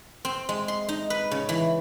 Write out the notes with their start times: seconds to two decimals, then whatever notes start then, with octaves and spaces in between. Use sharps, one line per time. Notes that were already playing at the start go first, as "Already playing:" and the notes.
0.25 C4
0.49 G#3
0.68 C6
0.89 D#4
1.10 B4
1.31 C#3
1.49 E3